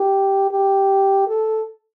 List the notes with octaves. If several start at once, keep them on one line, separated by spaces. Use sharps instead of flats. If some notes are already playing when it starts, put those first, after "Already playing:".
Already playing: G4
G4
A4